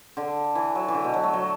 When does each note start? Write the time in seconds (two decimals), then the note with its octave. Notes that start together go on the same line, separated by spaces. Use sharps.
0.17 D3
0.55 E3
0.75 F#3
0.88 E3
0.95 D3
1.04 B2
1.14 F#3
1.24 A3
1.33 F#3